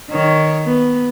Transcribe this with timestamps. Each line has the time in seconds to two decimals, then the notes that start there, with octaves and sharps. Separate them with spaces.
0.11 D#3 C#5
0.65 B3